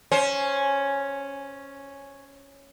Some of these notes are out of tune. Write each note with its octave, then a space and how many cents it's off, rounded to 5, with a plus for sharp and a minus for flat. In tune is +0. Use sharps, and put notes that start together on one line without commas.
C#4 +0 C5 +20